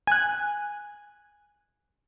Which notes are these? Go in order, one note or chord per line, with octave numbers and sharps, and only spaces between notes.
G#5 F#6